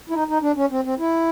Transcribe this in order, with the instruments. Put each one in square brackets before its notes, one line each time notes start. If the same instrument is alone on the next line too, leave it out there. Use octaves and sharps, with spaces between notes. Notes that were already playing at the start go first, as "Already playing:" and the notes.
[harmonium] E4
D#4
D#4
D4
C#4
C4
C4
E4